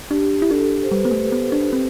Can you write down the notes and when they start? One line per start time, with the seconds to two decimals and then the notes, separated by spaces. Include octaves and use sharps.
0.11 D4 G4
0.42 E4
0.51 D4 A4
0.84 C5
0.92 G3 B4
1.05 B3
1.11 A3
1.32 B3
1.52 D4
1.73 C4